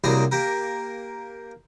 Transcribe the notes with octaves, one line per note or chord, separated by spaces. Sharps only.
C2 F#2 G3 A#3 G#4 A#5
A#3 G4 A#4